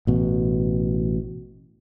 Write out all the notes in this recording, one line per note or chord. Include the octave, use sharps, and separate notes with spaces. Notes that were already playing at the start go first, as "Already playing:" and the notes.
A1 B2